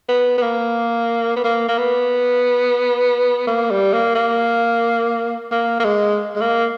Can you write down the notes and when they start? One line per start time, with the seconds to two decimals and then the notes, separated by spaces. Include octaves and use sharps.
0.09 B3
0.38 B3
0.42 A#3
1.36 B3
1.44 A#3
1.68 A#3
1.78 B3
3.47 A#3
3.71 G3
3.93 A#3
4.15 A#3
5.51 A#3
5.80 A#3
5.84 G#3
6.36 G#3
6.41 A#3